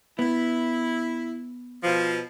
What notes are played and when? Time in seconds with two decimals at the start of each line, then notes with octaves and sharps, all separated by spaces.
0.19 B3 E4
1.83 B2 F3